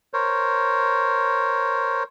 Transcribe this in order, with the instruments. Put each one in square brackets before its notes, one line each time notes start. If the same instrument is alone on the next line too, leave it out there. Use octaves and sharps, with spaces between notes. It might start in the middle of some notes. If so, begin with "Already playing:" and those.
[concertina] A#4 C5 C#5